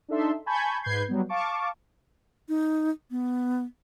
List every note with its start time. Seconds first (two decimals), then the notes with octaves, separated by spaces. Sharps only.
0.08 D4 D#4 A4 E5 C6
0.46 G#5 A5 B5 C#6 G6 G#6
0.83 G#2 B4 G6 G#6 C7
1.09 F#3 G3 B3
1.29 F5 A5 C#6 D6
2.49 D#4
3.11 B3